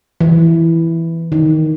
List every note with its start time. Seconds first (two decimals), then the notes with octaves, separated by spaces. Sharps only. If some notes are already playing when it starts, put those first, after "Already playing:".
0.20 E3
1.32 D#3